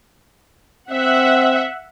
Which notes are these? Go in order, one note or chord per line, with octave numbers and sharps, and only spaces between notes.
C4 E5 F#5